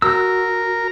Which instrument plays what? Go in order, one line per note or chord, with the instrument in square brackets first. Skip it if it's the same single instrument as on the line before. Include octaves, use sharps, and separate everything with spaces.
[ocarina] F#4 [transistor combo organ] A#4 [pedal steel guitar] E6